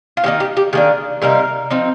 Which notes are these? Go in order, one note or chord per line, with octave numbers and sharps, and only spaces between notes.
F4
D#3 A#3 D#4 G4
G4
G4
D#3 A#3 D4 G#4
C3 G3 A#3 D#4 A#4
F3 C4 D#4